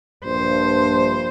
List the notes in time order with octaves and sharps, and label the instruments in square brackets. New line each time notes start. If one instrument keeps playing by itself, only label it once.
[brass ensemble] A#1 G2 [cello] C5